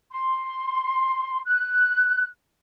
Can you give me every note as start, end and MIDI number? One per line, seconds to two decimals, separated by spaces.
0.11 1.41 84
1.46 2.26 90